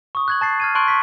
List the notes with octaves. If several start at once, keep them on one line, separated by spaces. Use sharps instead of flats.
C#6 D#6
F#6 G#6 F#7
A5 A6 C7
F6 G#6 D#7
A5 C6 C#6 F#6 D7 F#7
C#6 B6